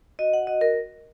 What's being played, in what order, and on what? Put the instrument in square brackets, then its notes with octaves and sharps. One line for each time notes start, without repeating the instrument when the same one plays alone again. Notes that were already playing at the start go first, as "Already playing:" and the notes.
[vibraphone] F#4 D#5
F#5
F#4 D#5
A#4